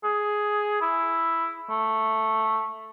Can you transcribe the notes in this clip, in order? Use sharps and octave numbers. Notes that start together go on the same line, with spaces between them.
G#4
E4
A3